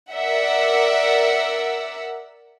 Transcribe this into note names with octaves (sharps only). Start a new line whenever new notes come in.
A#4 D5 E5 F#5 E6